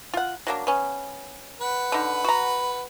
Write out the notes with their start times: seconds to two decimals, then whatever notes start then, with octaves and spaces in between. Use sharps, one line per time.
0.14 F4 F#5
0.47 F#3 A#3 D4
0.67 B3 C#4
1.61 B4 F#5
1.92 D3 D#4
2.24 F#4 A#5